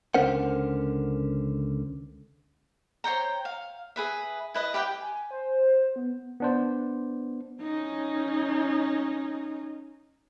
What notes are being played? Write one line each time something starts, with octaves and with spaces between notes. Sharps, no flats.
C#2 D3 C#4 A#4 C5 F#5
C5 C#5 G5 A#5
F5
G#4 B4 E5
E4 B4 D#5
G4 B4 F5 G5
G#5
C5
B3
B3 D4 C5
C#4 D#4